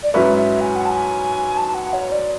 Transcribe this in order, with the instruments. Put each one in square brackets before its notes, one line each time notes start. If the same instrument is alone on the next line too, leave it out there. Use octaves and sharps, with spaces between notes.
[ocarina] D5
[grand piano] G#2 F#3 C#4 E4 B4 [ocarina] E5
[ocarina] E5
G#5
F#5
A5
G#5
A5
F#5
C#5
D5